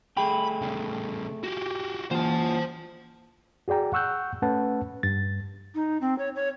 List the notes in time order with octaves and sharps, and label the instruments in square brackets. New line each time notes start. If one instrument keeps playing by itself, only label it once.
[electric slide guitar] A3 G#4 G5 [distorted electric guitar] B5
[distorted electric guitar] C#3 G3
F#4 G4
[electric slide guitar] E3 A#3 F4 [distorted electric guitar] C5 A5
[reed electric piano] F#4 G#4 D5 G5 A#5
F#5 C#6 E6 F#6 G6
A3 C#4 B4 F#5 A5
G2 A6
[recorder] D#4
C4
C#5
C#5